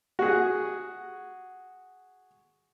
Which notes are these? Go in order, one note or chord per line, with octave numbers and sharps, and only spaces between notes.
F#4 G#4